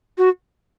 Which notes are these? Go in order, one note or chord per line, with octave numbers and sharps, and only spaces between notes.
F#4